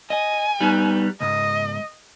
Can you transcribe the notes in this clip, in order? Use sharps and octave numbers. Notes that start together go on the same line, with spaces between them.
D#5 G#5
G3 B3 D#4
C#2 G#2 D#5